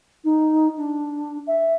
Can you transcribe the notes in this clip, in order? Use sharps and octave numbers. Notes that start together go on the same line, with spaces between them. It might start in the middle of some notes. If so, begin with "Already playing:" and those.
D#4
D4
E5